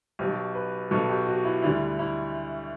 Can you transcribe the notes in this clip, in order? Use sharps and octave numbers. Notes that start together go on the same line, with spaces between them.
B1 B2 F#3 G4
B4
B1 B2 F#3 A4
G4
F#4
E4
D2 D3 G3 E4
E4